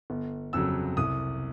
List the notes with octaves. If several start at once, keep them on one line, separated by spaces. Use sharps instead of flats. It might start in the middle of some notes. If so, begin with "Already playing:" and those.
G1
F2 C#3 F#3 E6
C2 D#6